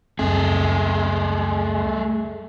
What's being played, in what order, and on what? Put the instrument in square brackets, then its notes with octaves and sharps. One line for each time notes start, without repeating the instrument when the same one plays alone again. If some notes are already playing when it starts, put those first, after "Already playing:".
[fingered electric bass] C#2 F#2 C4 [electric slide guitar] A3 G#4